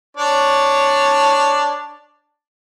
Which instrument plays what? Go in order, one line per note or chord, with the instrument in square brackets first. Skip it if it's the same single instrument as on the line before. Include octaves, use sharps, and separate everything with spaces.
[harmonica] D4 C#5 D5